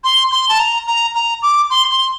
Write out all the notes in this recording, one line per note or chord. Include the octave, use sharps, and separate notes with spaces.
C6
C6
A5
A#5
A#5
A#5
D6
C6
C6